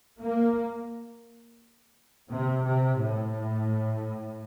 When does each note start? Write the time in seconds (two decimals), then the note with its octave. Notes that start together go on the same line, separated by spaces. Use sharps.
0.20 A#3
2.30 C3
2.65 C3
3.00 A2